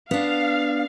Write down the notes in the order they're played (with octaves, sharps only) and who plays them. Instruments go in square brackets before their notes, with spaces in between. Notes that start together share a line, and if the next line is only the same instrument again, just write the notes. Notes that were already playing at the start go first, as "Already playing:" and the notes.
[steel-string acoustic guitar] B3 D4 [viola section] F5